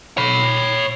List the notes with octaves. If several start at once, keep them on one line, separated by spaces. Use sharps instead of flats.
C#5 B5